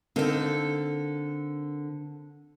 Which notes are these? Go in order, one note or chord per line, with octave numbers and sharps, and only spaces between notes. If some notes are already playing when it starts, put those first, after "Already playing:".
D3 A#3 C4 D#4 A4